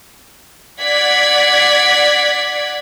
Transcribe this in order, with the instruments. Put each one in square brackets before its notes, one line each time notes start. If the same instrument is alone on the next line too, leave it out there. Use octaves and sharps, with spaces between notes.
[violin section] D5 F#5 G#6 B6